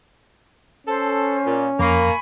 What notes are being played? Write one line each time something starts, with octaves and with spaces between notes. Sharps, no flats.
C#4 A4 C5
A#2
F2 A#3 G#5 B5 C#6